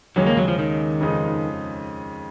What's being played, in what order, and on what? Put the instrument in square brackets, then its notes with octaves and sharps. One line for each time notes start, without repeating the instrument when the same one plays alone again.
[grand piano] D#2 C#3 G#3 C#4 [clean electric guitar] F#3
[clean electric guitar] A#3
F#3
F3
D#3
[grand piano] F2 C#3 G#3 D#4